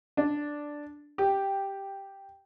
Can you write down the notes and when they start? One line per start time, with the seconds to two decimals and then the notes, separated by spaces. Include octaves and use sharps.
0.17 D4
1.18 G4